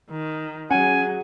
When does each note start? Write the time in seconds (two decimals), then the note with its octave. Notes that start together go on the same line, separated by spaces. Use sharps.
0.10 D#3
0.71 F#3 C#4 G#4 F#5 G#5